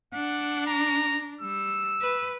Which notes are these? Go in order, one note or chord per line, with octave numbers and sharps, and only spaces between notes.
D4 F#5
A#5
G3 E6
B4